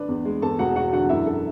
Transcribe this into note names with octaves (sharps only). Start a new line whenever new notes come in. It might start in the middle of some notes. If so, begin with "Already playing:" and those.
Already playing: D3 D4 B4
E2
G#3
E2 A4 A5
E1 F#4 F#5
E1 F#4 F#5
D3 F#4 F#5
F#2 E4 E5
A4